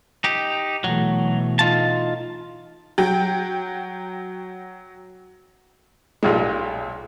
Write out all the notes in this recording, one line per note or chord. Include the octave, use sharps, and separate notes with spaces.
D#4 G4
B2 E3 F#3 A3
D#4 F4 A5
F#3 G5
B1 A#2 G3 G#3